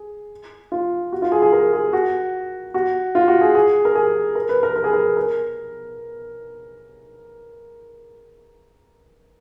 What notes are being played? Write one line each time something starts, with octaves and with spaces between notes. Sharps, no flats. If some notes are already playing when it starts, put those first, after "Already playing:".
Already playing: G#4
F4
F#4
F4
G#4
G#4
A#4
G#4
F#4
F#4
F4
F#4
G#4
G#4
A#4
G#4
A#4
B4
A#4
A#4
G#4
A#4
A#4